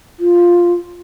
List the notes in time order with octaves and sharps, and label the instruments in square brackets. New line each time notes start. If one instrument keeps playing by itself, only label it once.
[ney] F4